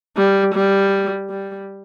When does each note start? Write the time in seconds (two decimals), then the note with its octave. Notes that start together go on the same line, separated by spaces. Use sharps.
0.17 G3
0.55 G3
1.30 G3